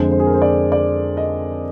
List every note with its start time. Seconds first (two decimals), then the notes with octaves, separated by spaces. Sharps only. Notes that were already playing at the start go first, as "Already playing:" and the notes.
Already playing: F2 D3 G#3 C5
0.11 C5
0.20 G#4
0.27 A#4
0.34 C5
0.42 D5
0.72 D5
1.17 D#5